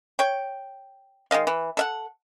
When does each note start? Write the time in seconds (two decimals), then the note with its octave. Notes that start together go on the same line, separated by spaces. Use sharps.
0.19 C#5 G5
1.31 D#3 G#3 D#5 F5
1.47 E3
1.77 A4 E5 F#5